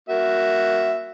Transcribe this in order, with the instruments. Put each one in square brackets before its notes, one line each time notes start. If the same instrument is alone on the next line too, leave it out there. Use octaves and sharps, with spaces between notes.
[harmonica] A#3 F#4 E5